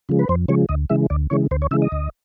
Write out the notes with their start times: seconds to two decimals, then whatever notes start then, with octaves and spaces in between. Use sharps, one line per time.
0.09 C#3 F3 G#3
0.19 B4
0.29 F2 C5
0.48 C#3 F3 G#3 C#5
0.69 D2 D#5
0.90 C#3 E3 G#3 E5
1.10 D2 D5
1.30 C#3 E3 G#3 C#5
1.51 D2 C5
1.62 C#5
1.71 C#3 E3 G#3 E5
1.82 D#5
1.92 D2